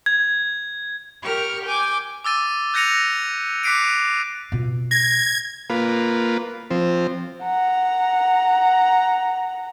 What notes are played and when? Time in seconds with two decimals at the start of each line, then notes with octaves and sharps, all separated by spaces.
0.06 G#6
1.22 G4 A#4 C#6 F6
1.63 G5 G#5 D6
2.24 D6 E6 A6 D#7
2.74 F#6 G6 A#6 C#7 D#7 F7
3.63 D6 F#6 B6 C7 D7 D#7
4.52 B2 F4
4.91 G#6 A#6
5.70 A#3 F4 B4
6.71 F3 C4
7.43 F#5 A#5